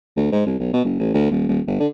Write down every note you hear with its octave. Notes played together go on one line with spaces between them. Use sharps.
D2
G#2
C2
B1
B2
F#1
A1
D2
D#1
D#1
G1
D3